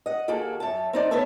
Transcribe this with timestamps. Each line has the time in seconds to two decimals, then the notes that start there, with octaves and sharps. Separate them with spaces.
0.06 D#5 F#5
0.28 D#2 A#3 F#4 G#4 A4
0.60 F#2 A5
0.93 C4 D#4 D5
1.11 B3 A4 B4 C#5 E5 A5